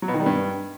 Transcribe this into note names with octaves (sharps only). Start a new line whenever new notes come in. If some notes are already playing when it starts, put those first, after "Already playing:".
F#3
B2
D#3
G3
G2